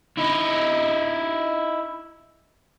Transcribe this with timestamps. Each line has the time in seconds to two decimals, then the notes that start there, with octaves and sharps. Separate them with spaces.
0.18 D#4 E4